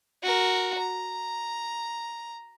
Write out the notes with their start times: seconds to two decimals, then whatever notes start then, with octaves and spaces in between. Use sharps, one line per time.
0.23 F#4 A#4
0.78 A#5